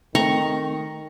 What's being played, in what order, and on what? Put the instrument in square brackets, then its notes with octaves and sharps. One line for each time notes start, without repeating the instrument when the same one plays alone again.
[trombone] D#3 [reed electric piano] A3 C4 [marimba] G5 [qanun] A#5 C#6